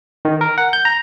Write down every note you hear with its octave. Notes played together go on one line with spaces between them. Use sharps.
D#3
A#4
F#5
G6
A#5